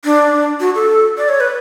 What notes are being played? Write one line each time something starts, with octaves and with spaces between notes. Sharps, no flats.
D4
F#4
A4
D5
C#5
B4